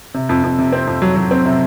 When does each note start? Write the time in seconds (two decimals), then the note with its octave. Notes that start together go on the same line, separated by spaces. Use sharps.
0.14 C3
0.29 F2
0.43 F2
0.58 C3
0.73 C4
0.87 F2
1.02 F#3
1.16 F#3
1.31 C4
1.45 C3